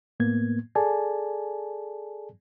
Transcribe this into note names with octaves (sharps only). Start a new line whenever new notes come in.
A2 A#3 B3 G#6
G#4 A4 D5 G#5 A5